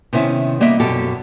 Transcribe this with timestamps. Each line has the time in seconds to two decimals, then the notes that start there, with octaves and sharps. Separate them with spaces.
0.13 C3 D#3 B3 C#4 E4
0.60 G3 A#3 B3 D#5 E5
0.80 F#2 B2 G4 A4